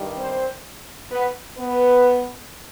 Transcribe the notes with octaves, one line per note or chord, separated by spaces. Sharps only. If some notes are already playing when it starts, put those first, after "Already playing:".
Already playing: G2 D#3 G3
C4 C5
B3 B4
B3 B4